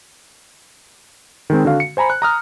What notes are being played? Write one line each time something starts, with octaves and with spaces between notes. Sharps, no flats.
D#3 G#3 C4
D3 F#4 F5
C#7
C5 G#5 A#5 B5
F#6
A#5 D#6 F6